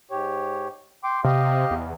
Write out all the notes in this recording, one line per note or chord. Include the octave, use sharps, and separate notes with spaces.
G#2 G4 C#5
G5 C6 D6
C3 G4 D#5 F5
E2